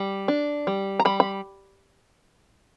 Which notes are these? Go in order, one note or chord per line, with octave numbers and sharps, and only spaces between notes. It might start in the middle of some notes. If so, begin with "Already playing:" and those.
Already playing: G3
D4
G3
A#5
G3 B5
B5